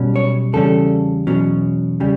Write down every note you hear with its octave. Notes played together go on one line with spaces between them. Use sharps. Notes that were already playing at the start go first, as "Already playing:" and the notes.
Already playing: B1 B2 G3 C#4
C#5
E2 C#3 G3 C#4 A4
E2 B2 F#3 C#4
C#3 G3